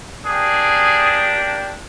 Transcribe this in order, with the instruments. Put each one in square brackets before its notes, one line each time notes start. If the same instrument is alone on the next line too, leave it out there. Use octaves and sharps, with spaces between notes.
[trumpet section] A#3 D4 G4 G#4